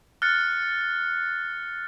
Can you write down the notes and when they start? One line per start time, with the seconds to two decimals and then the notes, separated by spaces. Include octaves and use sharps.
0.22 F6 F#6 A6 C#7